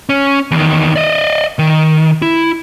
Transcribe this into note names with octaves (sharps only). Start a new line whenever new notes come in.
C#4
E2 D#3
D5 D#5
D#3
E4